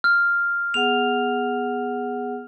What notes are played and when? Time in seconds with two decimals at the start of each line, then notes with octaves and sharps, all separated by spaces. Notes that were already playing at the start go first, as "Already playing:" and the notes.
0.04 F6
0.74 B3 G#4 F#5 F7